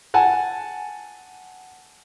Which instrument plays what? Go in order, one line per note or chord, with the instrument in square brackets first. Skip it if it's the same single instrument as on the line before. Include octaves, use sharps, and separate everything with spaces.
[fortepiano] F#5 G#5 A5